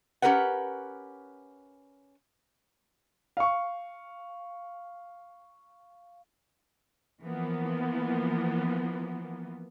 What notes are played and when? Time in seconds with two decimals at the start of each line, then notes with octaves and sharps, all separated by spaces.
0.22 C#4 G4 A#4 B4 F#5
3.37 F5 C#6
7.23 E3 F3 A#3 B3